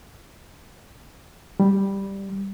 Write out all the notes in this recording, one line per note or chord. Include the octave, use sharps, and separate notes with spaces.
G3